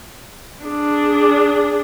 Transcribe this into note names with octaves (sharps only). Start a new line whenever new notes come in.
D4 G#4